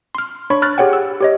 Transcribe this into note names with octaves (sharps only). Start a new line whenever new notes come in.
C6 F6
D4 C#5 B5 C#6
B5 F6 F#6 A6
G4 G#4 C#5 F#5 G5
E6
G4 C#5 D#5